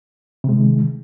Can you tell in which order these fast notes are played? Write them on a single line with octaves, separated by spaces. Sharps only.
C3 G#3 D#3